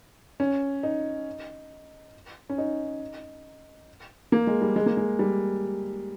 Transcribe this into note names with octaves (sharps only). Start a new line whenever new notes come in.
C#4
D#4
C#4
D#4
A#3
G#3
G3
G#3
A#3
G#3
G3